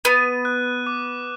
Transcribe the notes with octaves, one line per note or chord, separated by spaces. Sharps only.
B3 D#7
F#6
D6